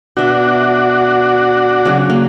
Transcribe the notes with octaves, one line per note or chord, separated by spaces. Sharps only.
B2 D4 F#4 E5
C#3 F#3
A#3